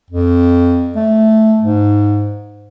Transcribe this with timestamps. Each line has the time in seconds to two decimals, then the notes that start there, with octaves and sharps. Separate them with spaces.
0.10 F2
0.96 A3
1.62 G#2